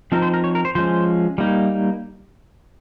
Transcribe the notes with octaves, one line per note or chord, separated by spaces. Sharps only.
F3 C4 D#4 A#4
C5
A#4
C#5
A#4
C5
F3 G#3 C#4 C5
G3 A#3 D#4